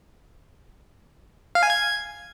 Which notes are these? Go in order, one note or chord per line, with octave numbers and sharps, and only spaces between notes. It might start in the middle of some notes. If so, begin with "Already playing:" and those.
F5
G#5
G#6